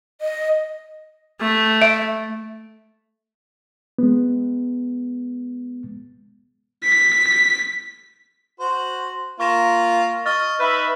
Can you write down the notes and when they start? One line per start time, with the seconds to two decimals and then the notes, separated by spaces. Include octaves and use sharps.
0.21 D#5
1.41 A3
1.82 E5
3.98 G#3 B3
6.83 B6
8.60 F#4 C5
9.40 A#3 F4 C#6 A#6 E7
10.26 D#5 C#6 F6 A6
10.60 D#4 B4 E5 B5